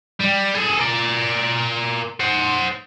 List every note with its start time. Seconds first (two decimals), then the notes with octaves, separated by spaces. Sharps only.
0.20 G3
0.55 G#4 A4
0.79 A#4 D5
2.20 C5 F#5